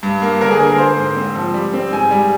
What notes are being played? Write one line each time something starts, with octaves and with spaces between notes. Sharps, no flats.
G2
A#3
D3 A#4
G#4
D3 A#4
A#4
A#3 C5
G#2
C4
F3
G3
C4
G#2 G#5
G3